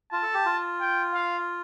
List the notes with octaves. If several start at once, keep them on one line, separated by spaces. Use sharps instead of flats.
F4 A5
A4
G4
F4
G5
F5